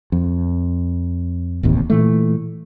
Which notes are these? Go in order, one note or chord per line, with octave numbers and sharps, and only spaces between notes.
F2
D1 A1 D#2 C3
A#2 E3 A3